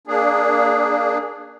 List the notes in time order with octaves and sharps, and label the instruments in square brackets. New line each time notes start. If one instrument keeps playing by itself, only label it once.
[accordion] A#3 D4 G#4